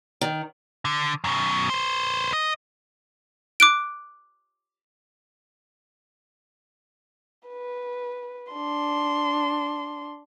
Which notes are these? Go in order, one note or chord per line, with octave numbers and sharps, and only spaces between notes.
D#3
D3
F#2 B2
B4 C5
D#5
D6 F#6 D7
B4
D4 C6